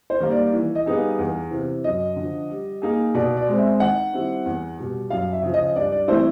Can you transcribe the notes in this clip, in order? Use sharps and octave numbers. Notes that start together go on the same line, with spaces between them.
C5
D#3 G3 A#3
D5
E3
D#5
G3 B3 D#4 G#4
F5
E2
C3 E3
F#2 D#5
D3 F3
G3
A#3 D#4 G#4
B2 D5
D5
G#3 C4
E5
D#3 F#5
G3 C4 E4
E2
B2 G3
F#2 F5
E5
C#3 F3
D#5
G2 D5
D5
E3 A3 C4 E4 C5